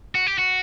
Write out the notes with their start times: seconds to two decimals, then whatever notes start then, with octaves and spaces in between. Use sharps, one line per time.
0.15 F#4
0.27 G4
0.38 F#4